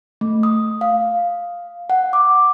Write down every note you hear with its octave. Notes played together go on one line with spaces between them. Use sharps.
A3
D#6
F5
F#5
D6